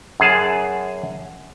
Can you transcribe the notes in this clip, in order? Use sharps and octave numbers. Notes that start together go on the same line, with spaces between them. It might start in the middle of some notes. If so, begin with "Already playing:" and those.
F#2 G#4 A5